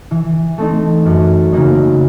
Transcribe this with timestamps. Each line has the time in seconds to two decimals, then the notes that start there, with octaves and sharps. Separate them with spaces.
0.11 E3
0.58 A3 C4 D#4
1.06 F#2
1.53 C#3 F#3 A#3 D#4